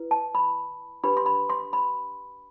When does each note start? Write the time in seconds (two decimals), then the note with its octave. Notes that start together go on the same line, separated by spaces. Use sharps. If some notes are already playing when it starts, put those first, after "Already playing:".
Already playing: E4 B4
0.11 A5
0.35 B5
1.04 D4 G4 B4 B5
1.17 C6
1.26 B5
1.50 C6
1.73 B5